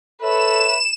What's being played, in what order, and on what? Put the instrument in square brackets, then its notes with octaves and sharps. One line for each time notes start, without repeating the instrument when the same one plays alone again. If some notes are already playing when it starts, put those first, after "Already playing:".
[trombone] A4 [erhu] B4 [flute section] C#5 E5 [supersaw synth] E7